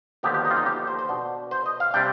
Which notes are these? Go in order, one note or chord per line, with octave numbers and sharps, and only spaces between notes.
D#2 D3 F3 B3 D#4 G4
G4
D#4
F4
D#4
G4
C5
C5
B2 B3 D4
C5
D#5
F5
C3 G3 D4 G5